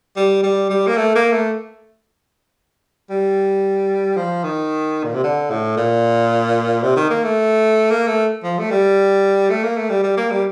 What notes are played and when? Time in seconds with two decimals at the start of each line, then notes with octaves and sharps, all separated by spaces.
0.16 G3
0.43 G3
0.70 G3
0.87 A#3
0.97 A3
1.15 A#3
1.32 A3
3.10 G3
4.17 F3
4.44 D#3
5.03 A#2
5.14 C3
5.24 D3
5.50 A2
5.77 A#2
6.83 C3
6.96 D#3
7.10 A#3
7.24 A3
7.90 A#3
8.07 A3
8.43 F3
8.59 A3
8.71 G3
9.50 A3
9.63 A#3
9.77 A3
9.90 G3
10.03 G3
10.17 A#3
10.31 G3